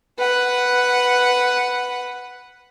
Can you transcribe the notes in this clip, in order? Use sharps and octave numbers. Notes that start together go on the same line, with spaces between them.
B4 F#5